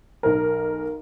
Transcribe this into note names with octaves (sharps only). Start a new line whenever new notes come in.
B1 A#4